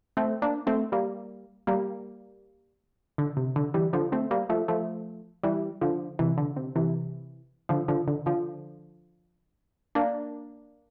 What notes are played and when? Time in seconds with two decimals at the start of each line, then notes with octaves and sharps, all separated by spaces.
0.17 A3 C4
0.42 A#3 D4
0.67 A3 C4
0.92 G3 A#3
1.67 G3 A#3
3.18 D3
3.37 C3
3.56 D3
3.74 E3 G3
3.93 D3 F3
4.12 A3 C4
4.31 G3 A#3
4.50 F3 A3
4.68 F3 A3
5.43 E3 G3
5.81 D3 F3
6.19 C3 E3
6.38 D3
6.56 C3
6.75 C3 E3
7.69 D3 F3
7.88 D3 F3
8.08 D3
8.26 D3 F3
9.95 A#3 D4